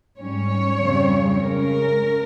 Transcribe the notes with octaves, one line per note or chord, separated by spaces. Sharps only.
G#2 G3 C#4 C#5
F2 C#3 G3 C4
C#3 G#3 C#4 A#4